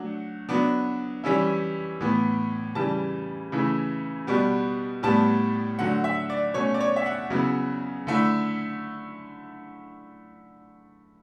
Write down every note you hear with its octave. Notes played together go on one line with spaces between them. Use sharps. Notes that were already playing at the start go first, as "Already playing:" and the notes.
Already playing: F#3 A3 D4 F#5
F#3 B3 D4
E3 G3 C#4 E4
A2 E3 B3
C#3 E3 G3 A5
C#3 E3 A3 E4
B2 G3 B3
A2 G3 B3 A5
D3 F#3 A3 F#5
E5
D5
B2 A3 C#4 C#5
D5
C#5
E5
F#5
C#3 F#3 B3 E4
D3 A3 E4